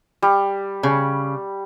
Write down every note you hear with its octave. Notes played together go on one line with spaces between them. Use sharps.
G3
C#3